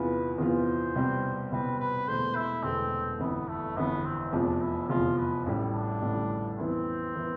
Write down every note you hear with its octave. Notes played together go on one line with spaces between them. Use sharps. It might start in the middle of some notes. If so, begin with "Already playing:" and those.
Already playing: E2 C3 E3 B3 F4 B4
E2 C3 E3 B3 F4 C5
C2 B2 G3 C4
C2 B2 G3 C4 B4
B4
E1 E2 B2 A3 C5
E4
E1 E2 B2 A3 C4
G1 F2 E3 B3
A3
G1 F2 E3 B3
C4
F1 E2 C3 F3 D4
E4
F1 E2 C3 F3 F4
B4
A1 A2 G3
D4
A1 A2 G3
F2 E3 B3 C4 E4
E3 B3 E4